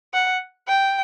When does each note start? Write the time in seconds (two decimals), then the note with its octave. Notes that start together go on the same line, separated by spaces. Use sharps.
0.14 F#5
0.68 G5